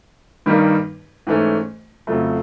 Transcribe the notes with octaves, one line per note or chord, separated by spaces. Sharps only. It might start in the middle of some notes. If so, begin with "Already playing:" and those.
G2 D#3 G3 A#3 D#4
G#2 E3 A3 C#4
F2 C#3 F#3 A3